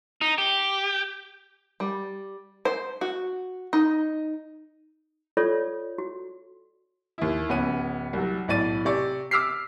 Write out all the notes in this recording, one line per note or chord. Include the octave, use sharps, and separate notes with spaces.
D#4
G4
G3
C5
F#4
D#4
F4 A4 C#5 D5
F#4
D#2 E4
D1 B3 C#4 D#7
C2 F#3
B1 A2 D5 A6 D#7
C3 D5 C#6
D6 E6 F6 B6 C7